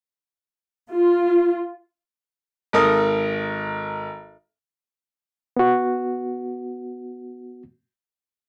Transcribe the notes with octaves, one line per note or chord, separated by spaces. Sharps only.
F4
G#1 A4 A#4 D#6
B3 F#4